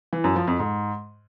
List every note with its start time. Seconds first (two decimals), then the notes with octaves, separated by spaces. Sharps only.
0.13 E3
0.24 F#2
0.36 F3
0.47 F2
0.59 G#2